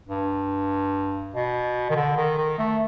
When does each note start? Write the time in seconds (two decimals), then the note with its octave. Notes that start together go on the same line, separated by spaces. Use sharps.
0.08 G2
1.34 B2
1.90 D#3
1.96 D3
2.17 D#3
2.38 D#3
2.59 A3